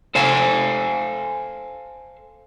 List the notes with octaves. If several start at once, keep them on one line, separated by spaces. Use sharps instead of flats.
A4 C5 F5 G#5